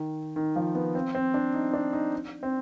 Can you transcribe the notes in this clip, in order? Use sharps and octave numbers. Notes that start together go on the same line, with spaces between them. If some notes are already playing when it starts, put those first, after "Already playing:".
Already playing: D#3
D#3
F3
B3
C4
C4
D4
D#4
D4
D#4
C4